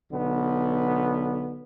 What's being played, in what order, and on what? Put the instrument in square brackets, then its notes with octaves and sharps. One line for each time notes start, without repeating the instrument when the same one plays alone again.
[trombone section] B1 D3 B3